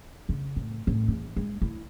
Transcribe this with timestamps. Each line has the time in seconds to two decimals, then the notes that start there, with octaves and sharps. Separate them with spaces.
0.29 C#3
0.56 A2
0.87 A2
1.08 E2
1.36 G#3
1.62 E4